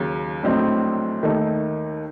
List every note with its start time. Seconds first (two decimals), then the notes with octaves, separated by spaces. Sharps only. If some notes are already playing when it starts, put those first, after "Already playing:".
Already playing: D#2 C#3 F#3
0.43 A#1 A2 F#3 C4 D#4
1.23 D#2 D#3 A3 D#4